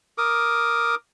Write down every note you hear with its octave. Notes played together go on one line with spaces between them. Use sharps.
A#4 D6 D#6